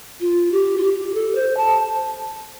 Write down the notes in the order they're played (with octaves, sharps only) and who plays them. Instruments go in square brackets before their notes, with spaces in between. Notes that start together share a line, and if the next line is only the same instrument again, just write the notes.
[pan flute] F4
G4
F4
G4
A4
C5
A5